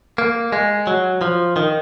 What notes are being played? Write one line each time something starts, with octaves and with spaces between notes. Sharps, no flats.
A#3
G#3
F#3
F3
D#3